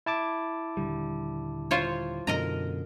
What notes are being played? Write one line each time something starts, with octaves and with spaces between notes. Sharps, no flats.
E4 A5 D6
D#1 D3 G3
F4 C5 C#5
F#2 B2 D3 A#4 D#5 A#5